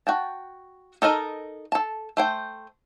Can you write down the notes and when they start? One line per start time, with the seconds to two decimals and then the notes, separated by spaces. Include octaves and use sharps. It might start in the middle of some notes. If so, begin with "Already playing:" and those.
0.07 F#4 G5 A5
1.02 D#4 A4 A#4 D#5
1.72 A4 A5
2.17 A3 C5 G5